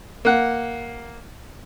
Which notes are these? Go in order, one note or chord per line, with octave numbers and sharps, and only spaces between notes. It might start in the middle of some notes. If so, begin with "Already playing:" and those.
A#3 F#5